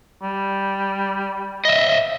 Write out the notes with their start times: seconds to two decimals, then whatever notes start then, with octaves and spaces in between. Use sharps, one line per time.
0.23 G3
1.65 D#5 E5